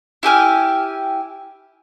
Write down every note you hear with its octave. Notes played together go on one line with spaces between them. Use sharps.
E4 G4 G#5 F6